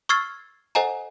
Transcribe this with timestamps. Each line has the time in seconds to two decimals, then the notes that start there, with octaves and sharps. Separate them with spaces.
0.09 C#6 E6 F6 G#6 A6 C7
0.75 A4 C5 D#5 F#5 G#5 A#5